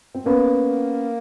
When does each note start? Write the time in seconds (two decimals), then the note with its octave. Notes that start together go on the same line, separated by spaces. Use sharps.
0.15 C4
0.26 A#3 B3 C#4